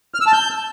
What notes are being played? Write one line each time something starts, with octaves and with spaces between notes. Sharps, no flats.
F6
E6
A5
G6